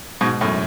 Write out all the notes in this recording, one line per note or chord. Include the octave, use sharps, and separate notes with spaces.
G#2 B2
F#2 A2